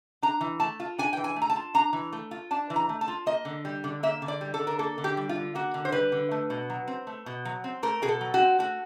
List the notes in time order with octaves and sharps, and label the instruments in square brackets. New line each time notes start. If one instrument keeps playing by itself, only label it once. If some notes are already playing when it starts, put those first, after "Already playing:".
[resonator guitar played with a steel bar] D4 A#5
E3
A3 A5
F4
D4 G#5
E3 G5
G#5
A3
A#5
A5
F4
D4 A#5
E3
A3
F4
D4 A5
E3
A#5
A3
A5
F4
A#3 D#5
D3
G3
D3
A#3 E5
D3
D5
G3
A4
D3
A#4
A#3 A4
D3
G4
G3
F4
D3
A#3 F#4
D3
C5
G3 B4
D3
A3
B2
F#3
C4
A3
B2
F#3
C4
A3 A#4
B2 G#4
A4
F#3
F#4
C4
A3 F#4